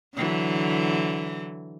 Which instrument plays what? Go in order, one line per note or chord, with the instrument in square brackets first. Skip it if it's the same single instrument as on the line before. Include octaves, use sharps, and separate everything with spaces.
[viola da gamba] D3 E3 F#3